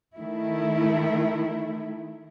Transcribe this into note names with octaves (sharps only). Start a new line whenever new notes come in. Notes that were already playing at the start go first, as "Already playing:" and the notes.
D#3 A3 E4